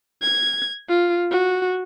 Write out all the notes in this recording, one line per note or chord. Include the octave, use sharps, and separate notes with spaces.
G#6
F4
F#4